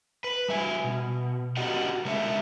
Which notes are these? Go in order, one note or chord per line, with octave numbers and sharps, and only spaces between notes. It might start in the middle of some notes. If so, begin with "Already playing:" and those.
B4
G3 E5 G#5
B2
F#4 G4 A#4 D5 D#5 F#5
C#3 G#3 A4 A#4 D5 E5